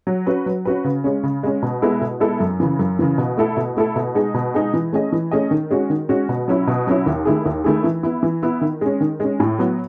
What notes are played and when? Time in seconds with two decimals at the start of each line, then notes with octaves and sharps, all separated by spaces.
0.07 F#3
0.27 C#4 F#4 B4
0.46 F#3
0.65 C#4 F#4 B4
0.84 C#3
1.04 G#3 C#4
1.23 C#3
1.43 G#3 C#4
1.62 B2
1.82 G#3 B3 E4 A4
2.01 B2
2.20 G#3 B3 E4 A4
2.40 F#2
2.60 C#3 E3
2.79 F#2
2.99 C#3 E3
3.18 B2
3.37 A3 E4 A4
3.57 B2
3.77 A3 E4 A4
3.96 B2
4.15 G#3 D#4 G#4
4.34 B2
4.54 G#3 D#4 G#4
4.74 E3
4.93 A3 C#4 G#4 D#5
5.12 E3
5.31 A3 C#4 G#4 D#5
5.51 D#3
5.71 G#3 C#4 F#4
5.90 D#3
6.09 G#3 C#4 F#4
6.29 B2
6.48 F#3 C#4 E4
6.67 B2
6.87 F#3 C#4 E4
7.06 D#2
7.25 D#3 A3 E4 G#4
7.46 D#2
7.64 D#3 A3 E4 G#4
7.84 E3
8.03 B3 E4
8.23 E3
8.43 B3 E4
8.61 D#3
8.81 G#3 C#4
9.01 D#3
9.20 G#3 C#4
9.40 A2
9.58 F#3 B3